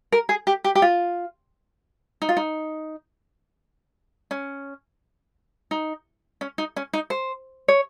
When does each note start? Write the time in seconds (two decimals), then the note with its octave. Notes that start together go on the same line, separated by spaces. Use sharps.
0.12 A#4
0.29 G#4
0.47 G4
0.64 G4
0.75 G4
0.82 F4
2.22 D#4
2.29 F4
2.37 D#4
4.31 C#4
5.71 D#4
6.41 C#4
6.58 D#4
6.76 C#4
6.93 D#4
7.10 C5
7.68 C#5